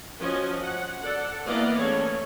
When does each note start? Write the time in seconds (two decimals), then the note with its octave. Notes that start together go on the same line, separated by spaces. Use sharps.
0.20 F3 C#4 F#4 D#5
0.61 F#5
1.00 A4 D5 F#5
1.46 E3 A#3 B3 D5 D#5 F5
1.78 A3 C#4 G#4 C#5